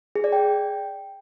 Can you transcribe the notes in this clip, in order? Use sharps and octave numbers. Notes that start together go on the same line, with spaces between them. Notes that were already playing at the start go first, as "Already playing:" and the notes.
G#4
D5
G5